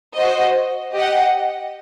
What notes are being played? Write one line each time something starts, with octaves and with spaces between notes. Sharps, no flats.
F#4 C5 D#5
G4 D#5 F#5